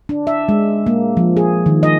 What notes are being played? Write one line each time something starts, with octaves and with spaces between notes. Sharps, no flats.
D4
E5
G#3
A#3
F3
G#4
D#3
D#5